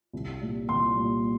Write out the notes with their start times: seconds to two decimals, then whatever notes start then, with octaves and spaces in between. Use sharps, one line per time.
0.13 C2
0.41 A#2 G3
0.69 C2 C6
0.96 A#2 G3